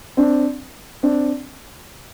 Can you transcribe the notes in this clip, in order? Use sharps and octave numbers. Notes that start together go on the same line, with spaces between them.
C4 D4
C4 D4